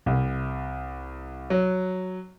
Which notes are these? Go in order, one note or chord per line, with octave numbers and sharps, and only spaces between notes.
C2
F#3